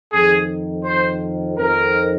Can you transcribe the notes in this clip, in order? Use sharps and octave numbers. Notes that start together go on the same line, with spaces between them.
F2 D#3 G#4
C5
F2 D#3 A#4